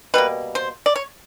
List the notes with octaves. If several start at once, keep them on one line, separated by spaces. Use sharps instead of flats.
B2 G3 A#3 B4
C5
D5
C#5